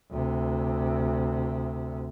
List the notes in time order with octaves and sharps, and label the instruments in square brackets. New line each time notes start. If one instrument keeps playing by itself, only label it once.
[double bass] D2 C3